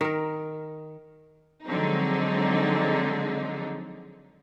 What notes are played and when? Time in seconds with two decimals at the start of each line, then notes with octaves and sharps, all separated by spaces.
0.01 D#3 A#4
1.65 D3 F3 F#3 G#3 C4 D#4